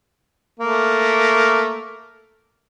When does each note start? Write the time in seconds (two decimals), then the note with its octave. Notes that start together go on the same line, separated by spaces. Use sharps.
0.59 A3 A#3